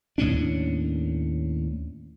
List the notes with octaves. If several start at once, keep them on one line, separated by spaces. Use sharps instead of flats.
D#2 A2 C#4 D4